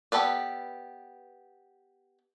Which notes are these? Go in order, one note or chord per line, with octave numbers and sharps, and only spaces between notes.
B3 G4 A4 B4 D5